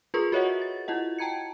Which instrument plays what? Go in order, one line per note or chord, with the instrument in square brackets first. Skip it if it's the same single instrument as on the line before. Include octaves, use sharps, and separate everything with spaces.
[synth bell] F4 G#4 A#4 B4 C6 C#6
F#4 A#4 C#5 D#5 E5 F#5
A6
E4 F4 D#5 F#5
G5 A5 A#5 G#6 C#7